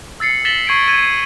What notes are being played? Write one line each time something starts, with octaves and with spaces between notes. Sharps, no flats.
E6 A6 C7 C#7
A6 B6 E7 F#7 G7
C#6 G#6 C7 D7
G#6 A6 D#7 G7